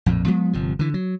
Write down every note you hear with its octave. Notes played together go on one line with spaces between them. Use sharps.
A#1 F2 A2
F3 G#3 B3
G1 C3 F3
D3 E3
F#3